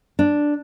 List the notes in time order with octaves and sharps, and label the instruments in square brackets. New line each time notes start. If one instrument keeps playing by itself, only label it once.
[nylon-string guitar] D4